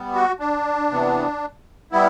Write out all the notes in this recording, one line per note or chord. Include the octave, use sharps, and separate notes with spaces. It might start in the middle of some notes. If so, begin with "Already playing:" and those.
Already playing: G3 B3
F#4
D4
C3 E3 B3
G3 B3 E4